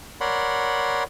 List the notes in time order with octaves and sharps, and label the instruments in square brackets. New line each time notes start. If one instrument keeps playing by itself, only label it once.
[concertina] A#4 C#5 D5 F#5 B5 C6